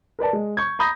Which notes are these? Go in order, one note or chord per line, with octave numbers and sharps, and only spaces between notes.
A#4 B4 D5 A5
G#3
C#6 G6 G#6
A#5 B5 D#6 G6 A#6